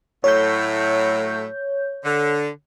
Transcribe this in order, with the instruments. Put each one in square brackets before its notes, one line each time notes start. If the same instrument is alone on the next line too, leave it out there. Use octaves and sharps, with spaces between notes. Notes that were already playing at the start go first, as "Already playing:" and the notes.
[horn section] A2 F#3 A3 [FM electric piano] C#5 G6
[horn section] D3